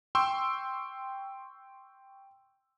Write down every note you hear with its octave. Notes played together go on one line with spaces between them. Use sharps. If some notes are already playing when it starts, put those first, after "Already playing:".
G5 C6 C#6 E6